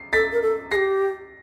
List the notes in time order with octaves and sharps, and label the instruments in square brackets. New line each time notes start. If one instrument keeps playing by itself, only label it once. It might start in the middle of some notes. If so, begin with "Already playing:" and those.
Already playing: [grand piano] C7
[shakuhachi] A4 [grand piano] A6 B6
[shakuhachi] A#4
A4
[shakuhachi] G4 G#4 [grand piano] A#6 C7